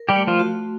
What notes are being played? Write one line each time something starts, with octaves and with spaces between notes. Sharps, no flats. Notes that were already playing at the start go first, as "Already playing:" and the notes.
Already playing: A#4
G3 G4
A3
F3 F4
F#4